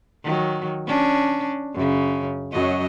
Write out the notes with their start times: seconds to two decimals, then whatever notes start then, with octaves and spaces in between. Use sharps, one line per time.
0.23 D#3 F#3
0.87 C#4 D4
1.74 F#2 C#3
2.52 F#2 F#3 D#5